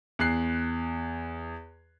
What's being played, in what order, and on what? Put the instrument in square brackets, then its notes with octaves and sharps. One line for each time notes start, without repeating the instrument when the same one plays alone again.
[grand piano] E2 F#6 C7